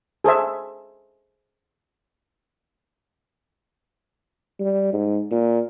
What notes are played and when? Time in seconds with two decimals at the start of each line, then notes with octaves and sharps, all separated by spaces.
0.24 G#4 A4 C5 E5
4.60 G3
4.93 G#2
5.31 A#2